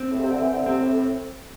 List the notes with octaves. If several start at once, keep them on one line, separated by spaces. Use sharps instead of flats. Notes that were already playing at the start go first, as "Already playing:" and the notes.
Already playing: C4
A2
C3
D3
E3
D3
C3 C4
A2
A2